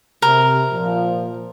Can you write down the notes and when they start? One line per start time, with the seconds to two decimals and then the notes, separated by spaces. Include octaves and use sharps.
0.22 C3 A#4
0.71 A#2 F3